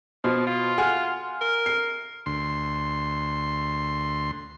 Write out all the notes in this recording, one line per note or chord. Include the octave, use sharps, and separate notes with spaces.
B2 F3
F4
F#5 G#5 F6
A#4
C7
D2 C6